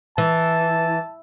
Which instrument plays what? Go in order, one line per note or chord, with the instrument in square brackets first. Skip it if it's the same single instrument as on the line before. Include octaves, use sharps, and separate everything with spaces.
[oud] E3 [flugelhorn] A5